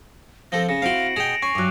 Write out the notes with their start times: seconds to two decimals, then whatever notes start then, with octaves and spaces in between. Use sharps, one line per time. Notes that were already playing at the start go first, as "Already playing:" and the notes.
0.52 F3 C4 A4 A#6
0.69 C#3 A#6 C#7 E7
0.82 C4 E4 F#4 F5 C6 C7 D7 F#7
1.16 B2 G#4 G5 D7 E7 F7
1.42 C#4 G#5 C#6 C7 D#7
1.55 G2 F#3 D6 E6 F#6